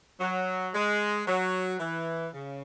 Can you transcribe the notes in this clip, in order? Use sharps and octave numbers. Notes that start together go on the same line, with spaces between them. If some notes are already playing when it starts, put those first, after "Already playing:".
F#3
G#3
F#3
E3
C#3